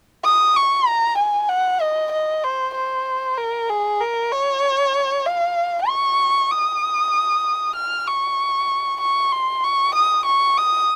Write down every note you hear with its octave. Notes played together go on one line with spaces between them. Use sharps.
D#6
C#6
A#5
G#5
F#5
D#5
D#5
C5
C5
A#4
G#4
A#4
C#5
F5
C#6
D#6
F6
C#6
C#6
C6
C#6
D#6
C#6
D#6